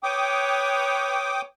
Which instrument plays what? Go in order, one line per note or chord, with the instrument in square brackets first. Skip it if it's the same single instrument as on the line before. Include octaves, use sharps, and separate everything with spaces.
[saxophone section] B4 C#5 [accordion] G5 D6 D#6